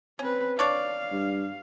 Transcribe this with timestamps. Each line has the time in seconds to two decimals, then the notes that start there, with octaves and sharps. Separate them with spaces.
0.19 C4 C#4 B4
0.59 D4 C#5 D5 F5
1.12 G2